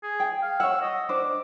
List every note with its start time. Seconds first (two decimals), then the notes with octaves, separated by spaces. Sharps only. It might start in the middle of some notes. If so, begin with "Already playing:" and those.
0.03 G#4
0.20 G5
0.42 F5
0.60 C#5 F#5 E6
0.82 D#5
1.09 D4 C5 D6